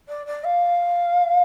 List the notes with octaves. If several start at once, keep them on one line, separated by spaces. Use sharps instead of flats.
D5
D5
F5